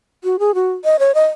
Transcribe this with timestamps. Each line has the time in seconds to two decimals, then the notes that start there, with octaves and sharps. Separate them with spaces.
0.24 F#4
0.39 G#4
0.55 F#4
0.85 D#5
0.99 C#5
1.15 D#5